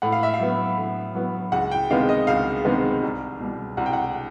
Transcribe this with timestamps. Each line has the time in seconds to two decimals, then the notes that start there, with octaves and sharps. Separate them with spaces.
0.02 A2 F#5
0.12 F5
0.23 E5
0.34 F5
0.40 F#3 B3
0.78 A2
1.15 F#3 B3
1.52 C#2 F#5
1.71 G5
1.90 C3 D#3 G#3 B3 F5
2.09 D#5
2.27 C#2 F5
2.65 C3 D#3 G#3 B3
3.03 C2
3.40 B2 G3
3.77 C2 F#5
3.86 G5
3.93 F#5